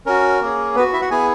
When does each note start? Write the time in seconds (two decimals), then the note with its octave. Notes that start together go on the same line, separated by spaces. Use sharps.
0.06 C#4 F#4 A#4
0.42 A#3 C#4 G#4
0.75 B3 F#4 B4
0.93 E4 E5
1.01 F#4 F#5
1.10 B3 E4 G#4 G#5